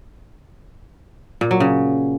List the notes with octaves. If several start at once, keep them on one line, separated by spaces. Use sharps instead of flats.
A#2
F#3
C#3